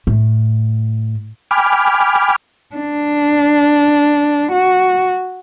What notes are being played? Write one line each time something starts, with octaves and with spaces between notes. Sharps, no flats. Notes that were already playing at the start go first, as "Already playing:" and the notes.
A2
G5 G#5 B5 D6 F6
D4
F#4